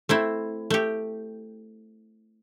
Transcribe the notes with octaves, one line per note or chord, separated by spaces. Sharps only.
A3 C4 E4
A3 G4